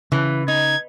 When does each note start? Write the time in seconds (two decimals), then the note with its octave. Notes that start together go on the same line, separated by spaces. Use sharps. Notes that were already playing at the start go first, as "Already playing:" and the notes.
0.12 C#3 E3
0.48 D#4 G#6